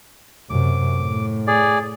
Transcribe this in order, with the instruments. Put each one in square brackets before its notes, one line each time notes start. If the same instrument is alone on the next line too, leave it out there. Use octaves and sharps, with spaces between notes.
[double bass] F#2 C3 [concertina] D6
[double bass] A2
[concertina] G#4 D5